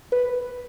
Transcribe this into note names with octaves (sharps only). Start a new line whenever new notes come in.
B4